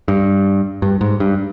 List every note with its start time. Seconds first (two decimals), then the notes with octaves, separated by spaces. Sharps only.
0.08 G2
0.82 G2
1.01 G#2
1.20 G2